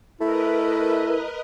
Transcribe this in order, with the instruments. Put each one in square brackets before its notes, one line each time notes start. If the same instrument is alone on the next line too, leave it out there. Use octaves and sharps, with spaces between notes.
[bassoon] A3 [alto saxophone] E4 [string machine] A#4 B4 D#5